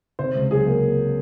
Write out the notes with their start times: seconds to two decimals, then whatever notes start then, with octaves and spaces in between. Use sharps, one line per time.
0.19 C3 C5
0.35 C#2
0.51 F#3 G#4
0.67 A#3